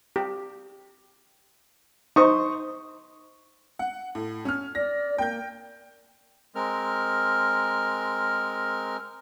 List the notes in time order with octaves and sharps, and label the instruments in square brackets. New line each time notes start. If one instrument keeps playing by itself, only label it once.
[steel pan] G4
[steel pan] D#4 [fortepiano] C5 C#6 D#6
[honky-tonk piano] F#5
A2
C#4 F6
[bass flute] D5 [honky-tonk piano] A#6
[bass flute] A#3 [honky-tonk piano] G5 G6
[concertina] G#3 C4 A#4 F6